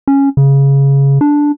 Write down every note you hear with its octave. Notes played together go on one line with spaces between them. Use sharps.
C#4
C#3
D4